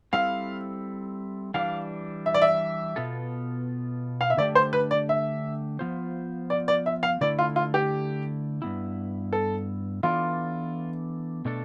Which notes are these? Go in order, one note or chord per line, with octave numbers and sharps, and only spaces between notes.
G3 C4 E4 A4 C5 F5
E3 G3 D4 F5
E5
D5
E5
B2 B3 F4 A4
F5
E5
D3 A3 D4 G4 D5
C5
B4
D5
E5
F3 B3 F4 C5
D5
D5
E5
F5
D3 A3 E4 A4 D5
F4
F4
G4
G2 E3 B3 E4
A4
E3 B3 D4 F4 A4 D5
B2 A3 D4 A4